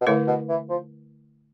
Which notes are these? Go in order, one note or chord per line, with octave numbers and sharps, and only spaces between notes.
B2
A2 D3 A3 E4 B4
B2
E3
F3